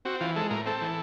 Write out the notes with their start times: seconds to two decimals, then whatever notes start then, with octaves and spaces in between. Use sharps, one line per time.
0.05 C4 F#4
0.20 E3 F4
0.36 G#3 A4
0.51 A2 A#4
0.66 C4 A4
0.81 E3